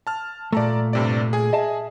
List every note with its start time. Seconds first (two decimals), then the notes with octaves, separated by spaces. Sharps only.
0.07 A5 F6
0.53 A#2 A3 D5 A5 A#5
0.93 G2 C3 D5
1.33 G#4 G#5
1.53 D#5 E5 A5